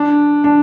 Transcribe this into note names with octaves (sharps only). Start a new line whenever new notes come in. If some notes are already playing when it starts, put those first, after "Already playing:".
Already playing: D4
D4